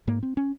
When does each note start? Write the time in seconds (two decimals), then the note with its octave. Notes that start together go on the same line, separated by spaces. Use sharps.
0.07 G#2 A#3
0.23 C4
0.37 C#4